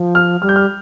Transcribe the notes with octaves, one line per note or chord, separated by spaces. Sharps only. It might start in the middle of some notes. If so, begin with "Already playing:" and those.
Already playing: F3
F6
G3 F6
G6
F6